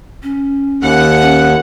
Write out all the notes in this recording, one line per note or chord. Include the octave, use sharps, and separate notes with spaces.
C#4
D#2 F#5
C#4